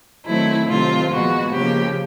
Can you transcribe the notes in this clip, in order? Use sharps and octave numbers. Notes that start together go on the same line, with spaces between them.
D#3 F#3 A3 C4 E4
C3 D#3 F#3 A3 C4 F4
A#2 F3 G#3 B3 F#4
C#3 F3 A#3 G4